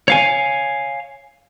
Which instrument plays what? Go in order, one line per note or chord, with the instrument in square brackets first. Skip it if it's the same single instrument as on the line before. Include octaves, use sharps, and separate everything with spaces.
[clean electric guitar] C#5 F5 G#5